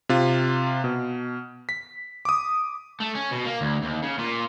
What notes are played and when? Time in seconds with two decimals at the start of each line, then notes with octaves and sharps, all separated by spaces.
0.09 C3 F4
0.84 B2
1.69 B6
2.25 D6 D#6
3.00 A3
3.15 C#4
3.31 B2
3.45 A#3
3.61 D2
3.83 D#2
4.03 C#3
4.19 A#2